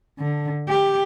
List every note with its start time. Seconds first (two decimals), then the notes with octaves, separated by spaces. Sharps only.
0.19 D3
0.68 G4